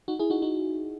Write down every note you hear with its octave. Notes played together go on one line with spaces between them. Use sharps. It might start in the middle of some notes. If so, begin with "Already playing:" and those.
D#4 F#4
E4 G#4
D#4 F#4
D#4 F#4